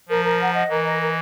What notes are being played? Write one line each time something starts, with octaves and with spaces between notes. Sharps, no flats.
F3 A#4
A#4
F#5
D#5
E3 A#4
D#5
A#4